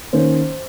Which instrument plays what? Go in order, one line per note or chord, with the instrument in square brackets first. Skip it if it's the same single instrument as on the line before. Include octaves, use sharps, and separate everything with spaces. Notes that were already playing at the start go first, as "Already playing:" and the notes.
[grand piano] D#3 A#3 C#4 C5